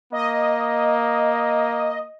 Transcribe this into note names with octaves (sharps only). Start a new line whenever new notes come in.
A#3 D#5